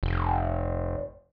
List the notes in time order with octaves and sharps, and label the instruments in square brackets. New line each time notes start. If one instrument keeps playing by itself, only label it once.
[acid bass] F1